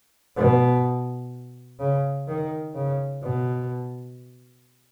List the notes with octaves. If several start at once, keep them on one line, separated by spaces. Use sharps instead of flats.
B2
C#3
D#3
C#3
B2